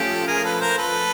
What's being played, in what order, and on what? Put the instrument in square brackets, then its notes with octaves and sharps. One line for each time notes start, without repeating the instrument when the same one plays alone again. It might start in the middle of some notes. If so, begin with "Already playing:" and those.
Already playing: [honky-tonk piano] F3 A3 C#4 F4 [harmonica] G4 A4
[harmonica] G#4 A#4
A4 B4
A#4 C5
A4 B4